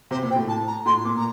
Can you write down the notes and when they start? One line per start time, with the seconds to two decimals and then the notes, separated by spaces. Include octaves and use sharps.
0.11 C3 C5
0.23 A#2
0.30 G5
0.36 A2
0.48 A5
0.67 A#5
0.86 A2 C6
1.05 A#2 D6
1.16 A#5